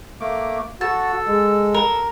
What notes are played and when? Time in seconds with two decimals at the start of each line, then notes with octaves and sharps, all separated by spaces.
0.20 A3 A#3 D6
0.81 F#4 A4 A5 E6
1.27 G#3
1.74 A#4